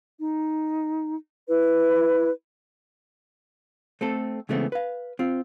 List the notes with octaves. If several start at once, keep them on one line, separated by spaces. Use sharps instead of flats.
D#4
E4 B4
A3 C4 A4
C#3 E3 G#3 A3 B3 C4
B4 F5
C4 F4